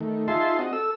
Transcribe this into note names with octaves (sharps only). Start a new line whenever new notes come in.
D#3 A3
D#4 F4 G#4 E5 A5 C6
C4 F#4 D#5
A4 E6